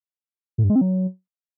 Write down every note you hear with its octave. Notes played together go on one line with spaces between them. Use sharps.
A2
G2
G#3
C4
F#3